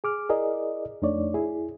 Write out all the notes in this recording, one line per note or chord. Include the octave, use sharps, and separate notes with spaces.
G#4 D6 F6
E4 G#4 A#4 D5 D#5
F2 A3 D4 D#4 C#5 D5
E4 G#4